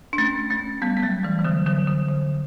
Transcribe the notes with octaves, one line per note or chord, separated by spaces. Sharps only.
D4
A3 C#4
A3 C#4
G3 B3
B3
F#3 A3
E3 G3
E3
D3 F#3
D3 F#3
D3
D3